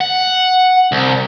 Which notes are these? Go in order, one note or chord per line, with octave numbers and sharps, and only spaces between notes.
F#5
C2